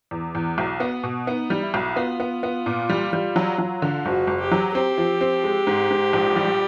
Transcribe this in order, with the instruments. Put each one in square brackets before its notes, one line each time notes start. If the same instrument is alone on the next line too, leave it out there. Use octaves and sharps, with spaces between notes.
[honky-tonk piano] E2
E2
B1
B3
B2
[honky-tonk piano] B3 [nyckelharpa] D#4
[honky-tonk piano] G3
[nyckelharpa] E4
[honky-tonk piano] B1
[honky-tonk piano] B3 [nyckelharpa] F4
[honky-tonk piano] B3
B3
A#2
G3
G3
F#3
F#3
D3
[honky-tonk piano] F#1 [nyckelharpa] F#4
[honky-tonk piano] F#1
[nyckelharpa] G4
[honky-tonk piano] F#3
[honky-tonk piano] C4 [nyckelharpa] G4
[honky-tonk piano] F3
C4
G#3
G#2
G#2
A#1
G3